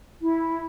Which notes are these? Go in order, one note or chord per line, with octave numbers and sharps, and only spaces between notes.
E4